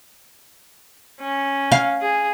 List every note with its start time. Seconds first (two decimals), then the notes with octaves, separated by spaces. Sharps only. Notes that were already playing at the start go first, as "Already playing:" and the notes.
1.21 C#4
1.72 F5
2.02 G#4